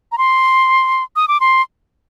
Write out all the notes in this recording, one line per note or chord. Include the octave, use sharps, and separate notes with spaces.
A#5
C6
D#6
D6
C6